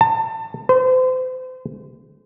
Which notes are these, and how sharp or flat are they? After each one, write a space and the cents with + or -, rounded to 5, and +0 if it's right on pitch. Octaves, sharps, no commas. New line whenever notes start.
A5 +30
C5 -35